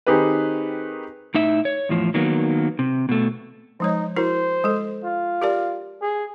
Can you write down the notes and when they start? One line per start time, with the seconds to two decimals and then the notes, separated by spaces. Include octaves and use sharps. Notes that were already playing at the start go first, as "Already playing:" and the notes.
0.07 D#3 C4 D#4 G4 G#4 B4
1.34 A2 D#4 E5
1.65 C#5
1.89 E2 A2 F3
2.14 D#3 F#3 A#3 B3
2.79 C3
3.09 B2 A3
3.80 F3 G#3 D#4 C#5
4.16 E4 F#4 A#4 C5
4.64 G#3 A4
5.04 F4
5.42 G4 A#4 D5
6.01 G#4